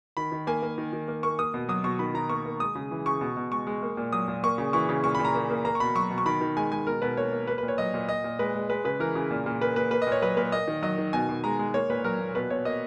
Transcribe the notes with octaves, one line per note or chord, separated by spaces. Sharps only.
D#3 B5
D#3
A#3 G#5
A#3
D#3
D#3
A#3
A#3 C#6
A#3 D#6
B2
F#3 D#6
B2 C#6
D#3 B5
D#3 A#5
A#3 C#6
A#3
G#3 D#6
C#3
E3
C#3 C#6
B2
B2
G#3 C#6
G#3
A#3
A#2
F#3 D#6
A#2
A#3 C#6
C#3
E3 C#6
C#3
A#2 C#6
A#2 B5
A#5
A#3
A#3
A#3 A#5
C#6
B2 B5
F#3 C#6
B2
C#6
D#3 B5
D#3
G#3 G#5
G#3 G#5
B2 A#4
B2 B4
A#3 C#5
A#3
A#3 B4
A#2 B4
C#5
F#3 D#5
A#2
A#2 D#5
A#2
G#3 B4
G#3
G#3 B4
C#3 B4
E3 A#4
C#3
A#2
A#2
A#3 B4
A#3 B4
A#3 B4
D#5
A#2 C#5
F#3 B4
A#2 B4
A#3 D#5
D#3
F#3 D#5
D#3
B2 G#5
B2
G#3 A#5
G#3
A#3 C#5
A#2 B4
F#3 A#4
A#2
B2 B4
B2 C#5
A#3 D#5